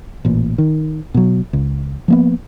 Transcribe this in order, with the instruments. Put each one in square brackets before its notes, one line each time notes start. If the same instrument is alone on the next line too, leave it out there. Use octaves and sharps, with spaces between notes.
[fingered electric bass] A1 A#2
D#3
B2 F#3
C#2
F3 A#3 B3